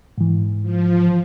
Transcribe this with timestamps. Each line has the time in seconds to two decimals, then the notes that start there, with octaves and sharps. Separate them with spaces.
0.18 G#2 E3
0.62 F3